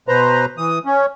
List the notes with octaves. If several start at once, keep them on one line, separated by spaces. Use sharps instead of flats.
B2 B4 C5 A#5
E3 D#6
C#4